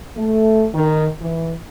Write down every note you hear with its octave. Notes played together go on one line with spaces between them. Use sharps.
A3
D#3
E3